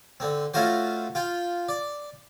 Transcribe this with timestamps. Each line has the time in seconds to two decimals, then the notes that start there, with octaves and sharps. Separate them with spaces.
0.20 D3 C4
0.54 A3 C#4 F4 F#4 C5
1.15 F4 G5
1.69 D5